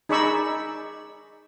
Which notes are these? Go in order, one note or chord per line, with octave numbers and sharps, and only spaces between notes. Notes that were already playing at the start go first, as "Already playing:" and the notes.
D#4 G#4 D5 B5 C#6 E6